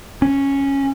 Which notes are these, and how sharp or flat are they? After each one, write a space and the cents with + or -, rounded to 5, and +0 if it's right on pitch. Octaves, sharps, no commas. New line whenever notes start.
C#4 -5